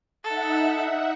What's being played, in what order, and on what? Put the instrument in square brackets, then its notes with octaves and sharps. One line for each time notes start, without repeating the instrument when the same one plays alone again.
[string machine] D#4 E5 F#5 [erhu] A4